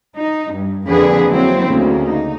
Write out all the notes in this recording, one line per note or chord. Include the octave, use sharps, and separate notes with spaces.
D#4
G2
F2 D3 A#3 D4 G#4 B4
F#3 A#3 C4 E4 C5
D2 C#3 A#3
D#4